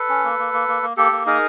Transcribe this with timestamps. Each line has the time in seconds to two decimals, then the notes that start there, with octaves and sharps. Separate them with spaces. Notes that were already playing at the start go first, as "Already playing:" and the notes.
Already playing: A4 B4
0.09 C#4
0.24 A#3
0.39 A#3
0.54 A#3
0.68 A#3
0.83 A#3
0.97 A#3 G4 A4
1.12 A#3
1.26 D#4 G#4 A#4